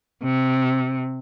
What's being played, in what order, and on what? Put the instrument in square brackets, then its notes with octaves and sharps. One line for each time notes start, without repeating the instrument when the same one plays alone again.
[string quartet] C3